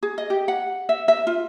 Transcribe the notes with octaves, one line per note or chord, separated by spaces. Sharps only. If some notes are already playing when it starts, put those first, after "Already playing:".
G#4
D#5
G4
F#5
E5
E5
F4